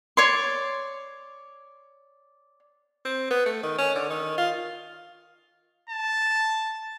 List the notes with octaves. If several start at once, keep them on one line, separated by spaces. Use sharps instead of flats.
C#5 D5 C6
C4
B3
A3
D#3
C#4
D3
D#3
F4
A5